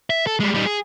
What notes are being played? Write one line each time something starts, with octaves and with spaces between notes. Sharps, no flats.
E5
A4
G3 G#3
G3 D#4
G#4